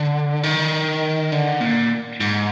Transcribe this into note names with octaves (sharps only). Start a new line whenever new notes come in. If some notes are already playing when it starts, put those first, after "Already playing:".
Already playing: D3
D#3
D3
A#2
G#2